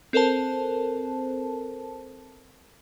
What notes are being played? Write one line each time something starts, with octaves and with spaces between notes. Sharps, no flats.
C4 A4 A#4 C5 A5